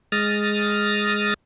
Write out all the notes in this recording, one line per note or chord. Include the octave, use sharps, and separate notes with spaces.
G#3 D#6 F6 A6 A#6